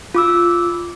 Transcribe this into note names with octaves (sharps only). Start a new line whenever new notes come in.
F4 D6 E6